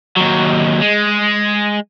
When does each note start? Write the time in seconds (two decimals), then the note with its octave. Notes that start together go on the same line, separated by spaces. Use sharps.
0.16 D#2 F#3
0.81 G#3